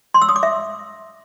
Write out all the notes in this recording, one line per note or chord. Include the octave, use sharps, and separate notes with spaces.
C6
E6
D#6
D6
E5